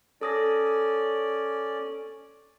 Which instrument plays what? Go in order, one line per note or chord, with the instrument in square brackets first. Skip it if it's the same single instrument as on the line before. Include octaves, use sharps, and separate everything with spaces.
[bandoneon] C#4 D5 [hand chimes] A4 D#6 A#6